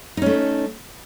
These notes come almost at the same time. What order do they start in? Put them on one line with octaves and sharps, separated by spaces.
D#4 C#4 A3